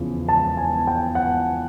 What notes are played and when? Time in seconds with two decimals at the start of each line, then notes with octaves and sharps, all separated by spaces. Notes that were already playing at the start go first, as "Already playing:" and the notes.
Already playing: E2 C#3 F3
0.29 A5
0.57 G#5
0.87 G5
1.15 F#5